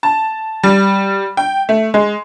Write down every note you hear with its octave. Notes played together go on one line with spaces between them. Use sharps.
A5
G3
G5
A3
G#3